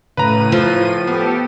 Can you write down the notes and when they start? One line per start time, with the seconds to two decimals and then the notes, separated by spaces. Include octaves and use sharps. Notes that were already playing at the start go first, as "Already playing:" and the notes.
0.17 A2 C#3 B4 A#5 D#7
0.52 F3 F4
1.07 B3 G4 A4